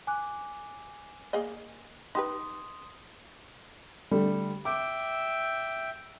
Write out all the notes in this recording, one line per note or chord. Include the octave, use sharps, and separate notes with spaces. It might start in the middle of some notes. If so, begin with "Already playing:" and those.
G#5 D6 F#6
A#3 G#4 D#5
D#4 G4 B4 C6 D#6
D3 G3 A3
E5 G5 D6